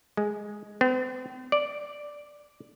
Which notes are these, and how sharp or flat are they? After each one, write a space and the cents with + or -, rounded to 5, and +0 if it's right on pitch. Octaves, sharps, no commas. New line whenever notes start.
G#3 +0
C4 -45
D5 +0